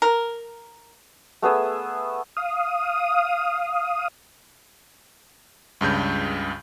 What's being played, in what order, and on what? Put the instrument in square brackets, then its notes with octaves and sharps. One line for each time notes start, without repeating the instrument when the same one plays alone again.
[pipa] A#4
[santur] A3 B3 G#4 E5
[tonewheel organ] F5 D#6
[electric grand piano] C#2 G2 C#3 G6